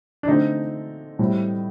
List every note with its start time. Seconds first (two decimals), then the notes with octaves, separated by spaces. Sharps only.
0.23 D4
0.27 D3 A3 C4 D#4
1.19 A2 G3 C4